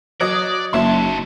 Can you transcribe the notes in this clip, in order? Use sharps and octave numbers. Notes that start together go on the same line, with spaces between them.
F#3 D5 D#5
F#1 D#2 F#3 E5 A5 C6